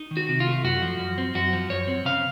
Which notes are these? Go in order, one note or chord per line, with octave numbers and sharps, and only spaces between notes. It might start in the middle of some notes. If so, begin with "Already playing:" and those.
Already playing: D#4
D#3
F#4
C3
F4
A3
F#2 F#4
F3
F#2
C4
F#2 F#4
F3
F#2 C#5
C4
C#3 F5